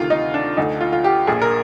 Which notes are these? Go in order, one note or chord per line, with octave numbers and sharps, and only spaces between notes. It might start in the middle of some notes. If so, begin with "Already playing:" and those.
Already playing: D2 C3 D#3 F4
D#4
D4
D2 D3 D#4
F4
F4
G4
A#1 A#2 G#4
A#4